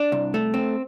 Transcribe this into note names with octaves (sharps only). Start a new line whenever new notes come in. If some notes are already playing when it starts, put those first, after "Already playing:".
Already playing: D4
C2
A3
C4